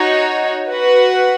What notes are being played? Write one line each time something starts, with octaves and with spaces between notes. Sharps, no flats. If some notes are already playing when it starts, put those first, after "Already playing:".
Already playing: D#4 F#4 C#5
F#4 B4 F#5